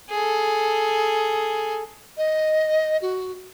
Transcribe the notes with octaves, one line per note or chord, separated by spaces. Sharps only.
G#4 A4
D#5
F#4